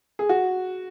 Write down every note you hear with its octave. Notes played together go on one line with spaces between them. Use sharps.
G#4
F#4